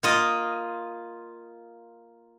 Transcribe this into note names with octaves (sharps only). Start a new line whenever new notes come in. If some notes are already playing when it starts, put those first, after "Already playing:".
A#3 F4 D#5